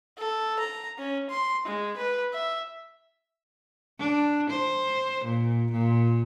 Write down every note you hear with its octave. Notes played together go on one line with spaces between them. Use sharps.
A4
A#5
C#4
C6
G#3
B4
E5
D4
C5
A#2
A#2